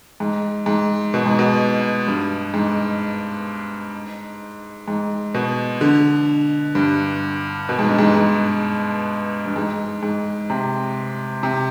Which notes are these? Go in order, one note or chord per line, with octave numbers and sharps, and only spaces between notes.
G#2
G#2
B2
G#2
B2
G2
G#2
G#2
B2
D3
G2
B2
G#2
G2
G#2
G#2
G2
G#2
G#2
C3
C3